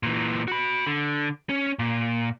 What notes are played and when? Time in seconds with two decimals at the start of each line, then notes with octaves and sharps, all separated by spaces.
0.03 A#2 E3
0.48 F#4 B5
0.86 D3
1.49 C#4
1.79 A#2